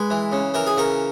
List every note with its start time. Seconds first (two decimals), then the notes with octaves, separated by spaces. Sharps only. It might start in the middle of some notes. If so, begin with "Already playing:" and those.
Already playing: G#3 B4
0.10 E3
0.32 C#3
0.54 E3 A#4
0.67 G#4
0.77 C#3 A#4